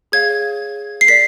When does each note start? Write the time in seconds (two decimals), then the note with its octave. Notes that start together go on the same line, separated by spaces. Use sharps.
0.12 G#4 C#5 F5 G#6
1.01 C7
1.08 A#4 D5 B6